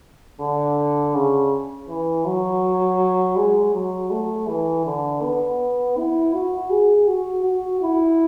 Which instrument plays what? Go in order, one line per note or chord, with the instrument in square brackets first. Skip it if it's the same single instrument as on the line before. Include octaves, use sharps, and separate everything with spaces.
[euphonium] D3
C#3
E3
F#3
G#3
F#3
A3
E3
D3
B3
E4
F#4
G#4
F#4
F#4
E4